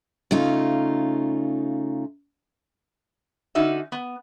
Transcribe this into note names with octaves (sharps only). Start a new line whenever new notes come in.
C#3 A3 D#4 F4
D3 C#4 D#4 F#4 E5
B3